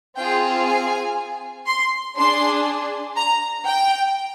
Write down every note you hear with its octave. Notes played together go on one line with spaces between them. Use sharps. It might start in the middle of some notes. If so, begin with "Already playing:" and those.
C4 F4 G#4 G5
G#5
C6
D4 G#4 C6
A#5
G5